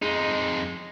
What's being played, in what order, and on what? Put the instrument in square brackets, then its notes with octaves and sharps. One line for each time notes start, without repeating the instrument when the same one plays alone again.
[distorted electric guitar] F2 D#4 [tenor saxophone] G#3